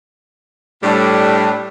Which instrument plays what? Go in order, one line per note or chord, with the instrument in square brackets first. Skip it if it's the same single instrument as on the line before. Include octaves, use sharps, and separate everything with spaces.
[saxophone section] A2 [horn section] G3 D4